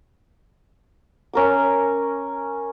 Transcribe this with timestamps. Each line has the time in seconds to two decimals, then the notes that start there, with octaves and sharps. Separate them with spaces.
1.33 C#4 A#4 D6